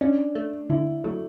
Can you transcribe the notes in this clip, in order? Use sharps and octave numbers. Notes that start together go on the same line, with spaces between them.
C#4 D4
A3
D3 E4
F#3 A3